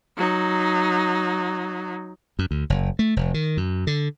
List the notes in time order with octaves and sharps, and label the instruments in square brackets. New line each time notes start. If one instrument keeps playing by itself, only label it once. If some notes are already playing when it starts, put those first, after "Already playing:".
[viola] F#3 D#4
[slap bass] F#2
D2
F#1
A3
F1
D#3
F#2
D3